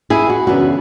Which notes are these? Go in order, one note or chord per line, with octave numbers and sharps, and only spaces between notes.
E4 G#4
F#4
F#2 C#3 E3 B3 D4 F#4